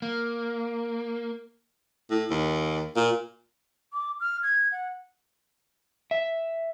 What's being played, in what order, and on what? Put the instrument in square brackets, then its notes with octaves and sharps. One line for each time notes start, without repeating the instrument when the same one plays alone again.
[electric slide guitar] A#3
[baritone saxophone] A2
D#2
A#2
[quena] D6
F6
G#6
F#5
[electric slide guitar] E5